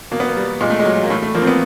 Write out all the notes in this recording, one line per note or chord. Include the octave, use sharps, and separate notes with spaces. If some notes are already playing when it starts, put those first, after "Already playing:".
B2 A#3
B3
A#3
G3
A#2 G#3
A3
G#3
F#3
A#3
A2 A3
A3
F3 A#3
C4
B3